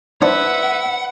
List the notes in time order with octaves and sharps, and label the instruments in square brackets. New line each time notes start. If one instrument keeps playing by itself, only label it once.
[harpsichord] D4 C5 [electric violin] B4 E5 [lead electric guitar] F#5